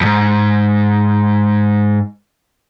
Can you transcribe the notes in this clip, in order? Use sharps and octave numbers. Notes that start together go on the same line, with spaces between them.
F2 G#2